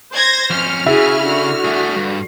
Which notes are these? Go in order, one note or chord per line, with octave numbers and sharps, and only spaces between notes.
C5 G#6 A#6
F2 C#4 F6
C#3 E4 F#4 G#4
D3 F#4
A3 G#4
G2